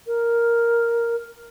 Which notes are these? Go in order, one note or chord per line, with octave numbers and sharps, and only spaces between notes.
A#4